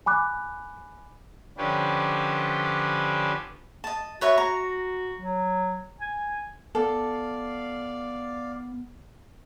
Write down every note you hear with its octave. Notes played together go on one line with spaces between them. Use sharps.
G#5 B5 D6 F#6
D3 F3 C#4 D4 G4 B4
D#5 A5
F#4 B4 C#5 E5
A#5
F#3
G#5
B3 A4 D5 F5